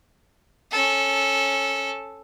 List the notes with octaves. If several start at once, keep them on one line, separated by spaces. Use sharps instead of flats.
C#4 A4